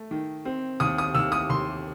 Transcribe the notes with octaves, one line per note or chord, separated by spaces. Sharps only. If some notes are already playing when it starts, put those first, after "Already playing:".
Already playing: A3
D#3
C4
D#2 D#6
D#6
D#2 E6
D#6
D#2 C6